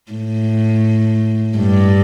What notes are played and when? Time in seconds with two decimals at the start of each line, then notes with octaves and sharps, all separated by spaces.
0.12 A2
1.58 G2